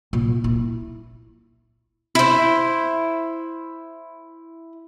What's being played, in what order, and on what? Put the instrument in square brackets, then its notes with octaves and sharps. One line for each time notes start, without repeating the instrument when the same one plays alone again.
[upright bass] A#2
E4
[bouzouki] E4 C5